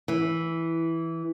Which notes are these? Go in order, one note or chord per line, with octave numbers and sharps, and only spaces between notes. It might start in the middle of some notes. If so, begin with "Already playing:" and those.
E3